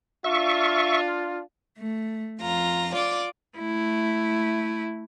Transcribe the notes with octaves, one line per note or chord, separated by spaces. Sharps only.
D4 F4 E5 C#6
A3
F2 F4 A#5
F4 D5 D6
A3 E4